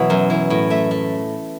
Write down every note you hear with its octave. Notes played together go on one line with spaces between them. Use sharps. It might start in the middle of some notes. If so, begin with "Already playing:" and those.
Already playing: B2 E3 F#3
F#2
E3
A2
A3 E5
A3